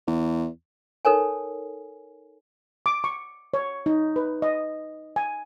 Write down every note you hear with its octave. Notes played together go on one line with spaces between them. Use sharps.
E2
D#4 A4 A#4 C#5 G#5
D6
C#6
C#5
D#4
B4
D#5
G#5